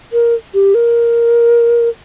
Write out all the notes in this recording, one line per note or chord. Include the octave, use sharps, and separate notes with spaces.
A#4
G4
A#4